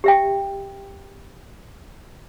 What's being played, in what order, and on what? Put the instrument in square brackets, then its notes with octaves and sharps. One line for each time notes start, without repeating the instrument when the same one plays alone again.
[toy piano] G4 E5 G5